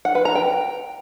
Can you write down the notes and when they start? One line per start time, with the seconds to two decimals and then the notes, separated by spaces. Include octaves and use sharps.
0.05 F#5
0.15 B4
0.25 A#5
0.35 G5